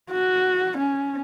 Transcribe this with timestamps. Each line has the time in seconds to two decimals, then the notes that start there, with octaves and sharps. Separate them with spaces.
0.12 F#4
0.78 C#4